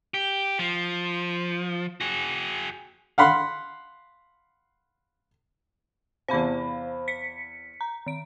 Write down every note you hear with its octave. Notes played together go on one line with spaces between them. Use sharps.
G4
F3
F#4 G#4
F5 F#5 B5 C6
E2 C3 C5 F5 B5
B6 C#7
A#5
D#3 D7